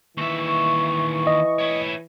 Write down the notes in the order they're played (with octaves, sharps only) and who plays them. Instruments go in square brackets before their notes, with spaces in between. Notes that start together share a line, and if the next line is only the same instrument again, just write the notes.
[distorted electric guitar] D#2 E5 [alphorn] E3 [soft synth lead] C#6
[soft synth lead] C#6
[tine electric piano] D#5
[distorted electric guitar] E4 C#5